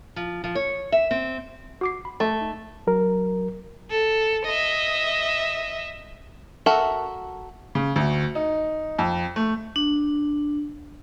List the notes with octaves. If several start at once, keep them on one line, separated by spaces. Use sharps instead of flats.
F3
F3
C#5
E5
C4
F#4 D6 C7
B5
A3 E5
D#4
F#3 A#4
A4
D#5 E5
F#4 A4 A#4 E5
C#3
D2
D#4
F2
A3
D4